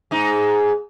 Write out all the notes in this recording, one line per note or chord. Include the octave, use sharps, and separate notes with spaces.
G#2 D#4